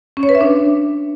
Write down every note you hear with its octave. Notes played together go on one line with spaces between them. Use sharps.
C#4
C#5
B4
E5
D4